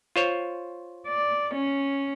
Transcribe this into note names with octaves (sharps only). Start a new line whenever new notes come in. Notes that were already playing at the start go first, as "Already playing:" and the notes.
F4 C5 C#5
D5
C#4